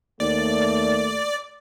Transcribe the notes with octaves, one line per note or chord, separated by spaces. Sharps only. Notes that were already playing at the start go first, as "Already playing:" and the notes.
D#2 A3 D5